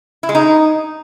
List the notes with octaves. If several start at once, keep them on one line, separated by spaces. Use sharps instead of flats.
E4
G#3
D#4